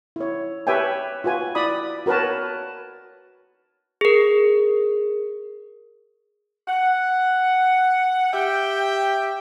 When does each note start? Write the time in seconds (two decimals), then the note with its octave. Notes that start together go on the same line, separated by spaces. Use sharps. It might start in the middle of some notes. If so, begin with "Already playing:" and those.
0.16 E4 C#5
0.67 G4 B4 C#5 E5 G5 G#5
1.24 F4 F#4 B4 G#5
1.55 E4 D5 B5 D#6
2.06 F#4 A#4 B4 C#5 A5
4.01 G#4 A#4
6.68 F#5
8.33 G4 E5 G5